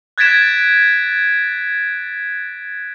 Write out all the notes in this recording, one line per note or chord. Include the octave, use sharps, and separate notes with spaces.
F#6 G#6 A6 B6 D7 E7